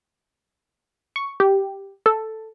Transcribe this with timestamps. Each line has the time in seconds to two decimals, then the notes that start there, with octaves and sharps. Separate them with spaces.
1.16 C#6
1.40 G4
2.06 A4